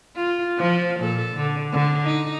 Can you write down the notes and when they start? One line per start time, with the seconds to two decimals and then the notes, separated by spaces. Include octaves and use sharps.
0.16 F4
0.57 F3
1.00 A#2 A4
1.35 D3
1.73 D3
2.04 D#4